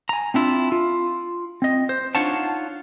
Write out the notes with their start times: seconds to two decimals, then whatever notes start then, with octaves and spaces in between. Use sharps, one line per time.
0.09 G#5 A#5
0.34 C4 D4 E4 F4
0.72 F4
1.62 C4 D#5
1.89 C5
2.15 D4 D#4 F4 C#5 F#5 A5